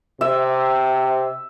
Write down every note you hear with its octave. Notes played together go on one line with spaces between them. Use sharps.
C3 E5